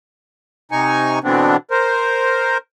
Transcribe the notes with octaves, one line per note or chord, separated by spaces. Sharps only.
C3 D#4 G#5 C#6
B2 D3 E3 B3 C4 D4
A#4 C5